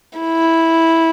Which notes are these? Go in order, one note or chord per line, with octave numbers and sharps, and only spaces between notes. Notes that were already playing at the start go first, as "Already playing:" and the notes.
E4